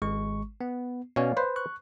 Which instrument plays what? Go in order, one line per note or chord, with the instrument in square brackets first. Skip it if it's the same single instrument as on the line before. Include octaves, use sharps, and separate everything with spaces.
[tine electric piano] G#1 G#3 C#6
B3
[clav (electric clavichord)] B2 C#4 G#5 [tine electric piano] C#5 D5 F5
[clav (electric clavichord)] B4 C5
[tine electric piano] C#6 F#6